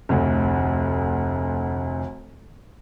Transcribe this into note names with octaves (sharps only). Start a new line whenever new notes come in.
F1 D2